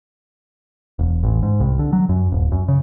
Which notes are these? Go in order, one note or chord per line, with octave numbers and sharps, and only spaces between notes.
E1
A1
G#2
C2
D3
F#3
F#2
D1
F#2
C#3